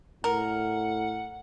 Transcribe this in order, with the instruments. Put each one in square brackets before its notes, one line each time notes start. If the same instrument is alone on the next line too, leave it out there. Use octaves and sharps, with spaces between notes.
[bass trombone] A2 [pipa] A#4 [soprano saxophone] F#5